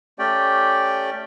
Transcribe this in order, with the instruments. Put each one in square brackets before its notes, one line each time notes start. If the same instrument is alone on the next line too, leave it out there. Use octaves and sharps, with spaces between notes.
[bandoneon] A3 C#4 G4 D5 G5